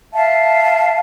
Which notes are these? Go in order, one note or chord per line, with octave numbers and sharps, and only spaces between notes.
E5 F5 A5